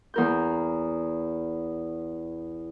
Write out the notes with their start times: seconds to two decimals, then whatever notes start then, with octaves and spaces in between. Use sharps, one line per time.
0.14 E2 A#4 G6